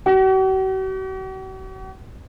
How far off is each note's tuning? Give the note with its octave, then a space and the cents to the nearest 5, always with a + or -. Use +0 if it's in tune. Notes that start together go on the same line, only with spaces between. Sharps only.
F#4 +45